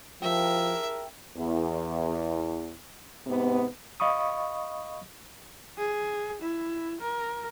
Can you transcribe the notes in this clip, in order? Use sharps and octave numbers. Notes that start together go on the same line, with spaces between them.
F3 E4 G4 G#4 A#4 E5 A5
E2
G#2 C3 B3
D#5 F5 B5 C#6 D#6
G#4
E4
A#4